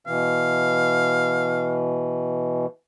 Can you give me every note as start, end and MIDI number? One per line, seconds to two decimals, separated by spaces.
0.07 2.66 47
0.07 2.66 52
0.07 1.82 77